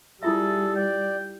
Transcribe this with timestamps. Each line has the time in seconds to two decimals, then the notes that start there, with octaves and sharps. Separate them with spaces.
0.23 G3 E4 F4 G#4 A4 E5
0.76 D5 G5